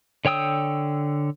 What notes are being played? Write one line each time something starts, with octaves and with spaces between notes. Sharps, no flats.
D3 C#5 G5 D#6 E6